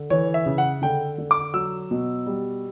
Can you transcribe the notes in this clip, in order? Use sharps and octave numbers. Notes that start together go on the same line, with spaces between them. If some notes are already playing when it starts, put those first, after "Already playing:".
Already playing: D3
E3 C#5
E5
C#3
F#5
D3 G5
D3
D6
F#3 E6
B2
G3